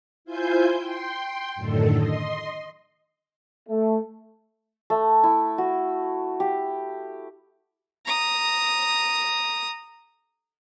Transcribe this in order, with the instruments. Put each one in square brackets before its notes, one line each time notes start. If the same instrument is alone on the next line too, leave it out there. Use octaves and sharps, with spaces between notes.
[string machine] E4 F4 C5 G#5 G6
G5 C6
F#2 A2 D3 D#3 A4
D#5 C6
[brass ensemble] A3
[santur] A3
E4
F#4
G4
[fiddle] A#5 D#6